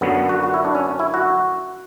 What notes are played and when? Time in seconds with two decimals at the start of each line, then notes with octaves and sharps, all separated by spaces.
0.01 F#2 D3 F#3 B3
0.15 B3
0.29 F#4
0.43 F#4
0.54 E4
0.65 D4
0.75 C#4
0.99 E4
1.14 F#4